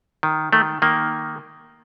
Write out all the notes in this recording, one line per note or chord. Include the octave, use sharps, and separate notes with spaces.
D#3
D#3 A3
D#3 A#3